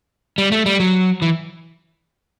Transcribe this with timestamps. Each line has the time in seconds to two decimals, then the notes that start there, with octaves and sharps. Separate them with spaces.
0.38 G3
0.52 A3
0.66 G3
0.80 F#3
1.22 E3